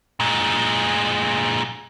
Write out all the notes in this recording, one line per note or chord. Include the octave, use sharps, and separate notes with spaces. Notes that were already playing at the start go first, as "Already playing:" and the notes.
A#2 G#3